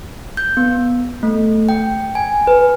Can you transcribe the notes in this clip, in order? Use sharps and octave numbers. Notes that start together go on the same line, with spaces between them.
G6
B3
A3
G5
G#5
B4